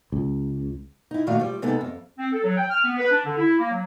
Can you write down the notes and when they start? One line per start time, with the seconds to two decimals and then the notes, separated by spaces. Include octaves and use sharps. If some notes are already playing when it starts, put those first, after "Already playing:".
0.12 C#2
1.11 D#4 E4
1.27 A#2 D#3 A3 F#4 F5
1.40 F3 G3
1.62 C3 G#3 B3 D#4 A4 A#5
1.81 F2
2.18 C4
2.32 A4
2.43 F#3
2.57 G5
2.69 F6
2.84 B3
2.98 B4
3.10 D4
3.24 D3
3.36 E4
3.59 A#3
3.70 F#3